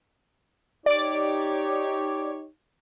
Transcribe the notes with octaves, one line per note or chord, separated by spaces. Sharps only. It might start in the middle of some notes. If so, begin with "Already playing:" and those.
D#4 G4 C#5 D5 D6